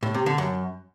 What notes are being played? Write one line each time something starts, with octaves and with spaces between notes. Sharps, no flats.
A2
C3
D3
F#2